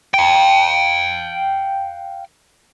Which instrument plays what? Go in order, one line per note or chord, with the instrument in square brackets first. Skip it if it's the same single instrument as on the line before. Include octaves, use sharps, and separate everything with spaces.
[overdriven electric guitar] F5 G5